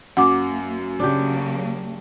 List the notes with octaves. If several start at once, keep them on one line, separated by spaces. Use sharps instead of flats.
F#2 A#3 F#5 D6
C#3 F#3 A#3 D4 G4